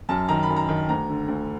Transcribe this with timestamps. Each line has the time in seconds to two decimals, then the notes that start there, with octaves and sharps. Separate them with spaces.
0.09 F#2 A5
0.28 D#3 A#5
0.43 B5
0.49 F#2
0.56 A#5
0.69 D#3
0.89 D2 A#5
1.09 D3
1.28 D2